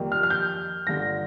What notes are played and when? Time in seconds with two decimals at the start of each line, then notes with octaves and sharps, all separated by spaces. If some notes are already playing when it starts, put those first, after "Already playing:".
Already playing: F2 D#3 G3 A#3
0.12 F6
0.23 F6
0.30 G6
0.87 G1 G2 D3 A#6